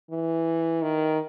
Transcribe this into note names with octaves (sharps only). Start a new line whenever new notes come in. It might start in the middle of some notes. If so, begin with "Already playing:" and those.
E3
D#3